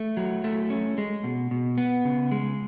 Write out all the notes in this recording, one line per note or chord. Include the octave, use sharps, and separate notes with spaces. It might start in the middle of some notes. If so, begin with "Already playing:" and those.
Already playing: A3
F#3
A3
C#4
G#3
B2
B2
B3
C#3
G#3